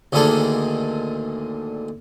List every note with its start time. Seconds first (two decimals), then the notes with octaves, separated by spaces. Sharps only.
0.12 D2 A#2 D3 D#3 G#4 A4